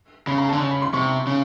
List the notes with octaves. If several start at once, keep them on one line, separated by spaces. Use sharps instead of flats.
C#3 B5
A#5
A5
D3
C#3
B5
C6
C3 C#6
C#3